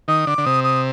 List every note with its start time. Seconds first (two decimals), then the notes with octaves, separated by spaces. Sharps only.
0.08 D#3 D#6
0.27 D3 D6
0.38 D3
0.45 C3 D#6
0.64 D#6